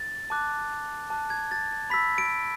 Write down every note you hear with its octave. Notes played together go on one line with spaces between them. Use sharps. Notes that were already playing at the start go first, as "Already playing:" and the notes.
Already playing: A6
A5 D6 F#6
A5 D6 F#6
G#6
A6
B5 E6 B6
D7